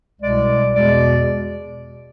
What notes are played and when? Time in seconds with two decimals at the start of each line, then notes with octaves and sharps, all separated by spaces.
0.21 C2 B2 G#3 D5
0.74 E2 B2 G#3 D5